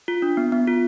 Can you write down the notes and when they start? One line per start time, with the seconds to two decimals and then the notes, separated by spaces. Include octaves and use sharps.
0.08 F4
0.22 D4
0.37 B3
0.52 B3
0.67 F4